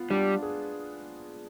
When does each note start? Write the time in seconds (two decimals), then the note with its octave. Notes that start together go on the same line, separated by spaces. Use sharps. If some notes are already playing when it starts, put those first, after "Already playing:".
Already playing: B3 F4
0.10 G3 D4
0.42 G#4